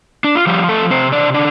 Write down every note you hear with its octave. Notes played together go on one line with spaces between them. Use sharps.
D4
F4
F3 G3 G4
A3 A4
C3 C4 C5
D4 D5
D3 D4 D5